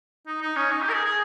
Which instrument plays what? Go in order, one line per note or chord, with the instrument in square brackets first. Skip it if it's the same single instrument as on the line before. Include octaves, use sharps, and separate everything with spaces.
[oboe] D#4
D#4
C#4
D#4
G4
A#4
G#4
G#4